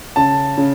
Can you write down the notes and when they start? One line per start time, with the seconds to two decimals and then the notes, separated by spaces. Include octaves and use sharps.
0.16 C#3 A5
0.58 C#3